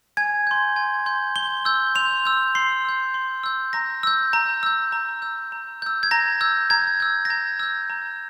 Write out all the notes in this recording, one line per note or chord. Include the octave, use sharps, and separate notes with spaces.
G#5 G#6
C6 G6
G#5 G#6
C6 G6
C6 G7
E6 G6
C6 F7
E6 G6
C6 C7
E6 G6
C6
E6 G6
A#5 A#6
E6 G6
A#5
E6 G6
A#5
E6 G6
A#5
E6 G6
G#6
A#5 A#6
E6 G6
A#5 G#6
E6 G6
A#6
A#5 G#6
E6 G6
A#5